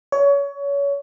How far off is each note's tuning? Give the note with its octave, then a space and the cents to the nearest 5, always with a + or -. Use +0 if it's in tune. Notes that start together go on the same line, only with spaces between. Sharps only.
C#5 +25